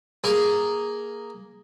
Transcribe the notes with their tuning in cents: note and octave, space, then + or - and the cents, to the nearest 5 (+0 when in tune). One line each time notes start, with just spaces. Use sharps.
A#3 +0 G#4 +0